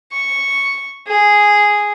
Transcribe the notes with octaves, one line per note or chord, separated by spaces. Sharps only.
C#6
G#4